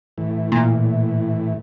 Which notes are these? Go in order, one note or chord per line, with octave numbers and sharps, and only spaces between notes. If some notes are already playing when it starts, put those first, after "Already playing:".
A2 E3
A#2